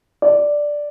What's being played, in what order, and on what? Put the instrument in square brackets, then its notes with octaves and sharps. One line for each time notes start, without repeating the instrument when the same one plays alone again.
[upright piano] D5